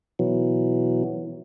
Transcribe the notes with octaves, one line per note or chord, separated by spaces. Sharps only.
B2 E3 F#3